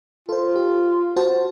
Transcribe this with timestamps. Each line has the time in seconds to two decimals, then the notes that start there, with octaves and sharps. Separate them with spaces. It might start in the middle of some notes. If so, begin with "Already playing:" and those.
0.29 F4 A4 C5
0.56 G4
1.16 F#4 C5 A5